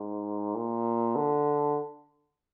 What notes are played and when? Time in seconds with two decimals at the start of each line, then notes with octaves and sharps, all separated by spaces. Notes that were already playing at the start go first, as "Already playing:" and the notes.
Already playing: G#2
0.55 A#2
1.16 D3